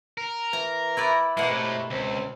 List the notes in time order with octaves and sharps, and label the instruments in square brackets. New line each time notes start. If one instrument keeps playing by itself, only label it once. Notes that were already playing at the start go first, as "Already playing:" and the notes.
[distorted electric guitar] A#4
[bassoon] E3 [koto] A#5
[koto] E4 B4 D5
[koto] B2 A#3 F#5 [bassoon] E3 [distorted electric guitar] G#3
[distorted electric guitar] A2 [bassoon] C3
[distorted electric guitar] C#2 [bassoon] C4